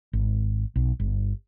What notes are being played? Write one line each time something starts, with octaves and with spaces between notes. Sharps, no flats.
G#1
B1
G1